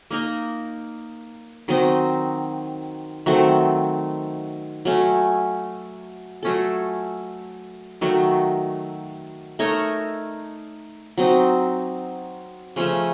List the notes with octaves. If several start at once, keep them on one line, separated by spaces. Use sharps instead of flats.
A#3 D#4 A#4
D#3 F#3 C4 D#4
D#3 F#3 A3 C4
F#3 A3 C#4
F#3 A3 C#4 A4
D#3 F#3 A3
A3 D#4 A#4 C#5
F#3 C4 D#4
C#3 F3 A3 C#4